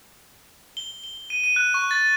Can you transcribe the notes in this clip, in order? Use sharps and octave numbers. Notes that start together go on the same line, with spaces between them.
G7
G7
D#7
D#7
F#6
C#6
A6